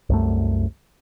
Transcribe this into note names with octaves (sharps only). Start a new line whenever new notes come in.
C2 F#2 A3